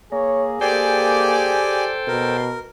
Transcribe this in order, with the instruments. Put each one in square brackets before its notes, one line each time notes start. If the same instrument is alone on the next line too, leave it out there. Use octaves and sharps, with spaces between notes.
[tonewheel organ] A#3 [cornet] G#4 [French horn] C#5
[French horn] A#3 [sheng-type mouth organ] G4 D5 G#5 [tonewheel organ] A4 C5 G5
[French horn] B2 [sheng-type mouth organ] A#4